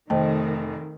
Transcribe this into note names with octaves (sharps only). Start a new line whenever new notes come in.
F1 D#3 A3 C5 D#5 G5